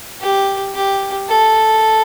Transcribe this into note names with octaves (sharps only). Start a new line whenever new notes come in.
G4
G4
A4